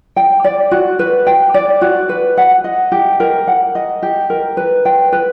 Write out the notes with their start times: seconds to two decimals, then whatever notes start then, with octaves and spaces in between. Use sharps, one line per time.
0.16 G5
0.44 D5
0.71 F#4
0.99 B4
1.26 G5
1.54 D5
1.81 F#4
2.09 B4
2.37 F#5
2.64 D#5
2.92 G4
3.20 A#4
3.47 F#5
3.75 D#5
4.02 G4
4.30 A#4
4.57 B4
4.85 G5
5.12 B4